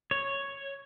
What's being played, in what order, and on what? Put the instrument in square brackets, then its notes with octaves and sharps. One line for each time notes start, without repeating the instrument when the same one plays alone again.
[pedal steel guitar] C#5